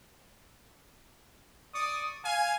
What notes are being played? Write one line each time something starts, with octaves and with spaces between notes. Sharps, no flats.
D5 C#6 D#6
F5 G#5